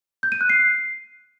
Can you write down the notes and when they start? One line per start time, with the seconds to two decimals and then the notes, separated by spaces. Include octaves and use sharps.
0.23 G6
0.32 D#7
0.41 F#6
0.49 C7